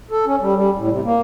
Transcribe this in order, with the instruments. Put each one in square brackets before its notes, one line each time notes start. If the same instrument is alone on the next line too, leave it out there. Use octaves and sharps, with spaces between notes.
[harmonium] A4
C#4
G3
G3
A2
C3
A#3